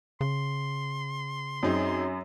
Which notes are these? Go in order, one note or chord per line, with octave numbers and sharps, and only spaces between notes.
C#3 C6
F#2 C4 D#4 G#4